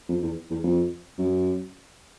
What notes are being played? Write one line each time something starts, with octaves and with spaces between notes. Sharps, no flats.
F2
E2
E2
F2
F#2